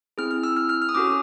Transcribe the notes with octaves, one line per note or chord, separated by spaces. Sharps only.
C4 E4 G#4 F6
F6
E6
F6
F6
F6
D#6
C#4 F#4 A4 D6